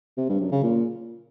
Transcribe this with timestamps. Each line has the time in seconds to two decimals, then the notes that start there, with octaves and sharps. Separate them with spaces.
0.17 C3
0.29 G2
0.40 F#2
0.52 C#3
0.63 A#2